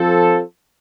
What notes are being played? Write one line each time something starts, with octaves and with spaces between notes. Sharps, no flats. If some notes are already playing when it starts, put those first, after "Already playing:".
Already playing: F3 C4 F4 A4 C5